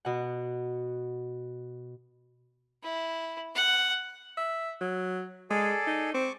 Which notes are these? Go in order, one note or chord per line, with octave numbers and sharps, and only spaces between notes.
B2 F#5
E4
F#5
E5
F#3
G#3 G#4 A4 D5
D#4
C4 C#6 D6